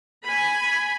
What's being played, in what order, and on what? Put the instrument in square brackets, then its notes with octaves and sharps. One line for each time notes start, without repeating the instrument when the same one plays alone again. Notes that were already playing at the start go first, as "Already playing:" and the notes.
[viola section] G#5 B5